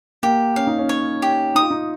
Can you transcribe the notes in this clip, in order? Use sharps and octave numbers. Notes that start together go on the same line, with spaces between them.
A#3 G4
C#4 F5
D#4
C#4
C#5
G4
D#4 D#6
F4
D#4